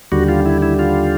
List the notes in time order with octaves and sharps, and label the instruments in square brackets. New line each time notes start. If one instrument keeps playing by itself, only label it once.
[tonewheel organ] D#2 D3 G3 F#4
F4
E4
E4
F4